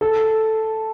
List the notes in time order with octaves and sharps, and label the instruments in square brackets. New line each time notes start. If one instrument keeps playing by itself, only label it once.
[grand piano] A4